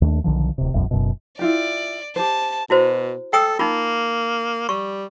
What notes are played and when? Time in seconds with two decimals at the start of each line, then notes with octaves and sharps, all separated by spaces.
0.01 D#2 A3 D4
0.24 B1 D3 D#3 F3
0.58 D1 C3
0.74 E1 B1 F#2
0.91 F#1 F#2 B2
1.39 E4 F4 G4 D5
2.16 G4 C5 A5
2.70 B2 E4 F#4 C5
3.33 A4 G5 D#6 E6
3.59 A#3 D#4 F4
4.69 G3 C#6